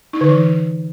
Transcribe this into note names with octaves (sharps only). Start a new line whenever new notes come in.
D#4
D3
E3